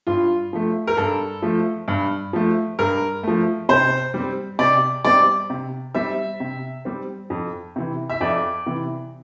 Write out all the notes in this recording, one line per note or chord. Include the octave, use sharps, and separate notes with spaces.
G2 F4
F3 A3
A#4
G2 A4
F3 A3
G2
F3 A3
G2 A#4
F3 A3
C3 C5
G3 C4
C3 D5
G3 C4 D5
C3
G3 C4 E5
C3
G3 C4
F2
C3 E3
E5
F2 D5
C3 E3